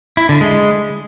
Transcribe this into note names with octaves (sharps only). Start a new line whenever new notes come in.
E4
D3
G#3